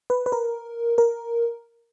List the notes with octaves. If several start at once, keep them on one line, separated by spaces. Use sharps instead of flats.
B4
B4
A#4
A#4